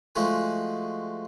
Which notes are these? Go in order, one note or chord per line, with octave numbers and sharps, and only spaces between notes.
F3 G#3 A3 F#4 G#5